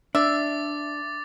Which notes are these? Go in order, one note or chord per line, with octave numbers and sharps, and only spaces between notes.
D4 E5 D6 A6